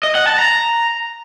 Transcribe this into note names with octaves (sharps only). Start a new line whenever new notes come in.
D#5
F#5
A5
A#5